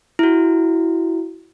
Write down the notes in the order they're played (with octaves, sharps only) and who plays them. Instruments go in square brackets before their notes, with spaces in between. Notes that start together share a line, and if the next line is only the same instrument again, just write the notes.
[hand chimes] E4 F#4